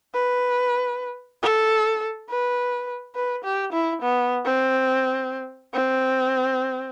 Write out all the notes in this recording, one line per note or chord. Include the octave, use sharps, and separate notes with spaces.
B4
A4
B4
B4
G4
E4
B3
C4
C4